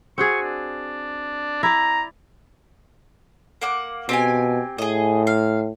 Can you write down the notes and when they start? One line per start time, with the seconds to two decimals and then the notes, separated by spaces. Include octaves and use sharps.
0.18 C4 F#4 G#4 C#6
0.42 D4
1.63 E4 D5 A#5
3.62 A#3 F#5 D6
4.09 B2 C4 G4 G#5
4.78 A2 G#4 D#5
5.27 F5